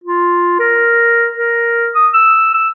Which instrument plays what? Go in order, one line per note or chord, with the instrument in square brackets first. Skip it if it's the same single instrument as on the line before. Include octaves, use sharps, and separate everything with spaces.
[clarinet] F4
A#4
A#4
D#6
E6
E6